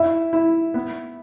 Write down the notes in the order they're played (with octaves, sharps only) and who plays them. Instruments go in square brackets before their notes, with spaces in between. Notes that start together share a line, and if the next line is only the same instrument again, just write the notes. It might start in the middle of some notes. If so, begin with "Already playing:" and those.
Already playing: [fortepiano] E4 [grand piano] E5
[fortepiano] E4
B3